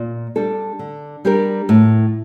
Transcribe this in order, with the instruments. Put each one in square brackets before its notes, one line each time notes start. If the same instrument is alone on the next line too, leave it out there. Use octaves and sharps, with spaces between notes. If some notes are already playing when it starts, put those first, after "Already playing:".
Already playing: [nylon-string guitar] A#2
G3 D4 A4
D3
G3 D4 G4 A#4
A2